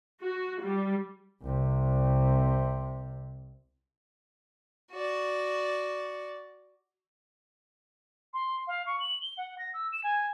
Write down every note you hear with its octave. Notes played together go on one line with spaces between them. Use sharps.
F#4
G3
C2 C3
F#4 D5
C6
F5
C#6
F#7
G7
F#5
A#6
E6
E7
G#5